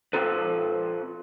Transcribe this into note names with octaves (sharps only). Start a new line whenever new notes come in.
C4 F4 A4 B4